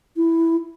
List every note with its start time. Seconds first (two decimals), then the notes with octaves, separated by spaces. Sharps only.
0.17 E4